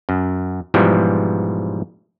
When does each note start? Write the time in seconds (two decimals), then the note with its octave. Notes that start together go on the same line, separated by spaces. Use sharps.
0.09 F#2
0.74 G#2 B2 E3 F3 G3